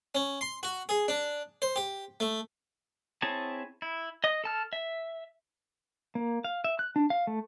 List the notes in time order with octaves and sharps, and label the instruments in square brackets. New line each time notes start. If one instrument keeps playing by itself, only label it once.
[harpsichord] C#4
C6
F#4
G#4
D4
C5
G4
A3
[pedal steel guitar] C4 E4 G#4 C#5 A5
E4
D#5 D#6
A4 A5 F6
E5
A#3
F5
E5
F#6
D4
F5
A3